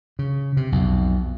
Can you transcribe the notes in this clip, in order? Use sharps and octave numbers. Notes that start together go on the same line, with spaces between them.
C#3
C3
B1 F2